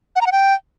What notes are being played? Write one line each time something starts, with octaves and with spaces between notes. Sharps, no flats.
F#5
A#5
F#5
G5